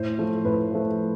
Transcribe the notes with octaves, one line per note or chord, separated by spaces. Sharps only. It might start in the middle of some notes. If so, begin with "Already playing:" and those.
Already playing: A2 C5
F3 A3
A2 B4
F3 A3